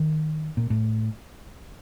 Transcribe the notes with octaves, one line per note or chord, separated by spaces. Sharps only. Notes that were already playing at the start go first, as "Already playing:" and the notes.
Already playing: D#3
A#2
A2